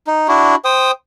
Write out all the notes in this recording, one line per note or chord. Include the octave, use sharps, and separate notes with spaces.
D#4
D4 E4 F#4
C5 G5 D#6